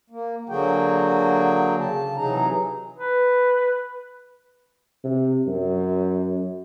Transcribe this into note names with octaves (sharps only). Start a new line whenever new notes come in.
A#3
D3 F#3 A#3 F#4 G#4 G5
C#3 A5
C3 E3 F#3 D#4 G#4 A#5
B4
C3
F#2